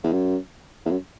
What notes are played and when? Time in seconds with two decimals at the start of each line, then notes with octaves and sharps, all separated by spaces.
0.04 E2
0.13 F#2
0.86 E2
0.91 F#2